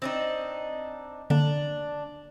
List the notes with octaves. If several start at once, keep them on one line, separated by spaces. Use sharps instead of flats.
C4 D4 D#4
D3 A#3 D4